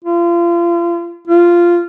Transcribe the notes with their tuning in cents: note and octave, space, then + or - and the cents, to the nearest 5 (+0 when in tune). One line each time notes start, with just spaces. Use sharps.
F4 -35
F4 -10